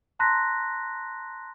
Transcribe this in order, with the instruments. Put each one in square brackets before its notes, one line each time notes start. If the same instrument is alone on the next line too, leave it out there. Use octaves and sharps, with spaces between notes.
[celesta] A5 A#5 C6 F#6 A#6 B6